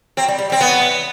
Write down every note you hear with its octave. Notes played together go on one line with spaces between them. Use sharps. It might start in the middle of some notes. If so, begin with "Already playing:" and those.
F#3 C4
G3
G3
G3 C4
F#3 B3
E3